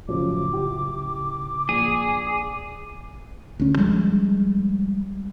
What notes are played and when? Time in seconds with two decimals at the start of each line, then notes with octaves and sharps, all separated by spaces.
0.09 F#2 A2 C#3 F3 D6
0.53 E4 G4
1.69 A#1 G#4
3.60 D2 C#4
3.77 F3 G3 G#3